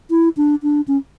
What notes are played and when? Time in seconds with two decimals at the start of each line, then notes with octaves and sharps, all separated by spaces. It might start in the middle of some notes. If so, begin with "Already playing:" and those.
0.11 E4
0.37 D4
0.63 D4
0.88 C#4